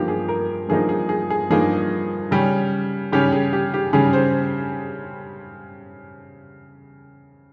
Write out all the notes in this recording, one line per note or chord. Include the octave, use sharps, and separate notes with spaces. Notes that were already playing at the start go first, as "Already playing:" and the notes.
Already playing: G2 F3 A#3 D#4 G4
G#4
A#4
G2 F3 A#3 D#4 G#4
G#4
G#4
G#4
G2 F3 A#3 D#4 G#4
C#3 G3 C#4
C#3 G3 C#4 G4
G#4
G4
G4
C#3 G3 C#4 G#4
C5